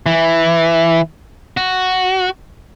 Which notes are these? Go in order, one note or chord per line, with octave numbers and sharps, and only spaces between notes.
E3
F#4